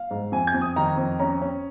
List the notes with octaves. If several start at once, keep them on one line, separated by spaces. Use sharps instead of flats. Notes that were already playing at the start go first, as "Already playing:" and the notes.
Already playing: F5
G#2
F2 G#5
G#6
F2
D#6
D#3 A#5
F2
C#4 A#5
C#4